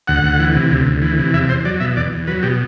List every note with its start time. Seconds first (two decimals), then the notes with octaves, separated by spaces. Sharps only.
0.07 D2 F#5
0.23 D2
0.39 E3
0.54 C3
0.71 D2
0.86 D2
1.02 E3
1.18 C3
1.33 E2 E5
1.49 E2 C5
1.65 F#3 D5
1.80 B2 E5
1.96 E2 D5
2.12 E2
2.27 F#3 B4
2.43 B2 G4